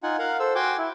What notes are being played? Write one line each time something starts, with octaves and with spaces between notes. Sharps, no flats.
D#4 F4 F#5 G#5
A#4 F5 F#5
A4 C5 E6
F#4 G5 G#5 C6 D6
E4